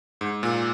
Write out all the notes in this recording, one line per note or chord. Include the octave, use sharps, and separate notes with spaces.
G#2
A#2